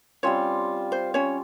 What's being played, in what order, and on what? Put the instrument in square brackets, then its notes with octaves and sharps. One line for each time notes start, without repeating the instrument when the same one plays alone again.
[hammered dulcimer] G3 C4 F4 [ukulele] C#4 C#5
[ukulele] C5
C#4 C#5